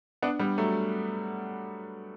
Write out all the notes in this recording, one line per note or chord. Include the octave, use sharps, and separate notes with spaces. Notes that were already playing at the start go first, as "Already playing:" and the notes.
B3 D4
G3 B3
F#3 A3